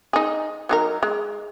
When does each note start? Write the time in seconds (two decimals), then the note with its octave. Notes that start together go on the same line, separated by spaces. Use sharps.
0.13 D#4 G#4
0.69 F#3 D#4 A#4
1.03 G#3